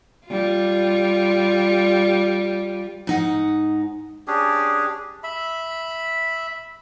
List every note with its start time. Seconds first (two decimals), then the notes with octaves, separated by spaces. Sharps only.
0.27 G3 F4
3.07 G#2 D#4 F#5
4.27 C#4 D4 G4 G#4
5.23 E5 B5